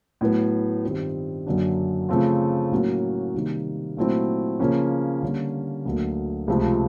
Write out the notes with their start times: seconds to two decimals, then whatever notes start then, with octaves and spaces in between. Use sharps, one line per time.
0.21 A2 F#3 B3
0.84 G2 D#3 G3 C4 F4
1.46 F#2 D3 F#3 A#3 D4
2.09 C#3 F3 A3 C4 F4
2.71 A2 F#3 A#3 C#4 F#4
3.35 C3 D#3 G3 A#3 D#4
3.97 A#2 F#3 A3 C4 E4
4.59 C#3 F3 A#3 C#4
5.23 D3 G3 A#3 C#4
5.85 D2 D3 F#3 A#3
6.47 C#2 C3 F3 A3 C4